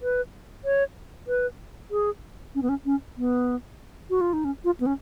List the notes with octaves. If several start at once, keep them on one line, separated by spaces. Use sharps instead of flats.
B4
C#5
B4
G#4
C#4
B3
C#4
C#4
B3
F#4
F4
D#4
C#4
F4
B3
C#4